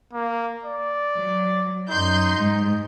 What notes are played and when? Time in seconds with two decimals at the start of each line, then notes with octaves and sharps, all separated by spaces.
0.13 A#3
0.64 D5
1.16 F#3
1.90 F#2 D#4 C6 G6
2.37 G#2